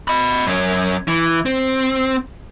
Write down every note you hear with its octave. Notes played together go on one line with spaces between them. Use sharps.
D#5 B5
F#2 C#4
E3
C4